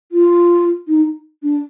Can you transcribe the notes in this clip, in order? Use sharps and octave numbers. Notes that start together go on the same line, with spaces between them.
F4
D#4
D4